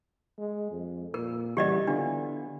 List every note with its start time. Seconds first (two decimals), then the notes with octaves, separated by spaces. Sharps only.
0.38 G#3
0.71 F2
1.14 A#2 A#4
1.57 C#3 E3 G3 F#4 G4 D5 D#5
1.87 D3 B3 D4 E4 F4